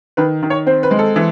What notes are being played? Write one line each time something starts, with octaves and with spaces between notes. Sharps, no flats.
D#3 B4
D#3
C#5
C4 C5
B4
G#3
A4
E3